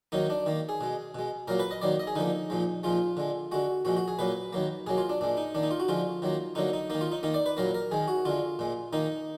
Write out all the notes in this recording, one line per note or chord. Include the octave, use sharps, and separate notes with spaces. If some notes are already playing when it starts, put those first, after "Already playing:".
D#3 F#3 A#3 D#4
D4
D#3 A#3
G#4
B2 G#3
B2 G#3
A#2 F#3 A#3 A#4
B4
D#5
D#3 F#3 A#3 D5
D#5
G#4
D3 F3 A#3 D#4
A#2 F3 G#3
A#2 F3 G#3 F4
D3 G#3
D3 G#3 F#4
A#2 F3 G#3 F#4
F#4
G#4
A#2 F#3 A#3 B4
D#3 F#3 A#3
B2 F#3 A#3 G#4
F4
D4
A#2 G#3 D4
D#4
D#3 A#3 D4
D#4
F4
F#4
D3 F3 G#3 F4
D#3 F#3 A#3
D3 F#3 A#3 D#4
D#4
D#3 A#3 D#4
F4
D#4
D#3 A#3 D#4
D5
B4
A#2 F#3 A#3 A#4
A#4
D#3 G#3 G#4
F#4
D3 G#3 F4
A#2 G#3
D#3 A#3 D#4